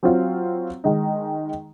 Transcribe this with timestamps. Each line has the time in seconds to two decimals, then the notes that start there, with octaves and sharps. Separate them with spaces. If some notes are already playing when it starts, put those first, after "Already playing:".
0.03 F#3 C4 F4
0.84 D#3 G#3 D#4